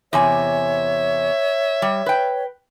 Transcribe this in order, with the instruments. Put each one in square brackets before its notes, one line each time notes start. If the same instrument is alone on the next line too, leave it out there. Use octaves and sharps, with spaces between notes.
[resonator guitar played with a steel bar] E2 C3 G#5 [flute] C#5 [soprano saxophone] E5
[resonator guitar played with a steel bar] G3
B4 G5